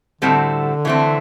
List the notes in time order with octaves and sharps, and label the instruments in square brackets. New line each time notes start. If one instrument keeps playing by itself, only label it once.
[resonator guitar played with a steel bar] A2 G3 C4 F#4 A4 [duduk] D3
[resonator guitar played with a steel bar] E3 A3 C4